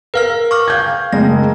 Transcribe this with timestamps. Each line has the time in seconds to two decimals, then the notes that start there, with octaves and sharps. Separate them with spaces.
0.14 A#4 B4 F5 F6
0.51 C#6 D6 F6
0.68 F5 G6 G#6
1.13 F#1 G#3 A#6